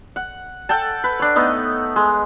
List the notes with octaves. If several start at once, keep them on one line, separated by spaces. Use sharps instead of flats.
F#5
A4 F#5 G5 A5
B4
D4 C#5
A3 B3 D#4 D#5
G#3